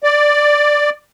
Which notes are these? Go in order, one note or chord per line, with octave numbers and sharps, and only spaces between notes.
D5